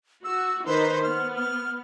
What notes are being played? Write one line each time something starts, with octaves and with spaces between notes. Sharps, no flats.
F#4 E6
D#3 D#4 B4 C5
B3 F6
F6